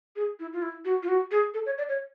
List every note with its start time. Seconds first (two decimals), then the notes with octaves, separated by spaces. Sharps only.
0.16 G#4
0.40 E4
0.53 F4
0.62 E4
0.85 F#4
1.03 F4
1.08 F#4
1.31 G#4
1.54 A4
1.66 C#5
1.78 D5
1.89 C#5